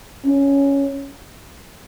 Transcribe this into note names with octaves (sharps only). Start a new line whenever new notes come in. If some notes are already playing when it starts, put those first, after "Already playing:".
C#4